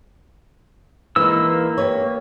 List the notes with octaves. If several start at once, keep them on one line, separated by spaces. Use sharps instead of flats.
E3 G#3 A#3 D#4 E6
G4 B4 C#5